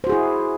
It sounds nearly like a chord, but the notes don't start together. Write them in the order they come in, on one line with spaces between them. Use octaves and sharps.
C5 F#4 G#4 E4